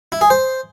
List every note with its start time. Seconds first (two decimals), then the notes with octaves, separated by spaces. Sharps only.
0.12 E4
0.21 G#4
0.30 C5